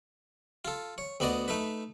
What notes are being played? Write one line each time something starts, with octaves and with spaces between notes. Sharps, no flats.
F4 A4
C#5
D2 B3 F#4 D5 D#5 D#6
A3 D#4 B4